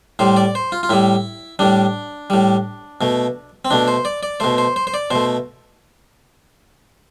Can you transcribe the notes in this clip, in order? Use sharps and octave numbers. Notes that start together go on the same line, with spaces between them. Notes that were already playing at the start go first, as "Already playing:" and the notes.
A2 G3 C5
D5
C5
F4
F4
A2 G3 E4
A2 G3 D4
A2 G3
B2 A3
C4
B2 A3 D4
C5
D5
D5
B2 A3 C5
C5
C5
C5
D5
B2 A3 C5